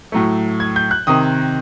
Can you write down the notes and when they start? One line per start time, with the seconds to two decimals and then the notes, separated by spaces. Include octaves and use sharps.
0.12 A2 F#3 A3
0.60 G#6
0.76 G6
0.91 F#6
1.07 C3 D#3 D#6